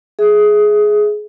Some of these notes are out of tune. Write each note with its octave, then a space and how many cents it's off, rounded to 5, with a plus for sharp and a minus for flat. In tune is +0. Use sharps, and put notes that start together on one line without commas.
G#4 +10 E5 +0